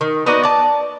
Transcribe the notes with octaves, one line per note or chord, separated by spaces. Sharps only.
D#3
B3 D#4 F#4 D5
D5 A5